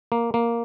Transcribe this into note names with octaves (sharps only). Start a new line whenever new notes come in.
A#3
A#3